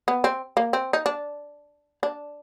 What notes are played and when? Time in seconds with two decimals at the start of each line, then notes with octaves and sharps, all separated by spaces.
0.08 B3
0.24 C4
0.57 A#3
0.73 C4
0.93 D#4
1.06 D4
2.03 D4